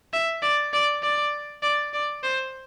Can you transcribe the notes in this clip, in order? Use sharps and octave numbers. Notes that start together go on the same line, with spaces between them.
E5
D5
D5
D5
D5
D5
C5